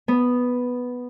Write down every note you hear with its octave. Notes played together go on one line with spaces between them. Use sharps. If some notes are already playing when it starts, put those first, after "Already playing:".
B3